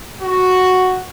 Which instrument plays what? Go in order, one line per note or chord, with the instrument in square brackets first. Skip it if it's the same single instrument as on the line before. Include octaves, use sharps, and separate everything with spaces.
[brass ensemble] F#4